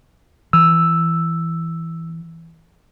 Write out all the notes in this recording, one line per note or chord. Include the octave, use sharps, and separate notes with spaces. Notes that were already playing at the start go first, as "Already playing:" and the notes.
E3 E6